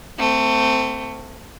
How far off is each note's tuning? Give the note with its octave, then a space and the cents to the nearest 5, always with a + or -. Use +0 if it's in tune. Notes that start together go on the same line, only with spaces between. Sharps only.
A3 +20 C4 -15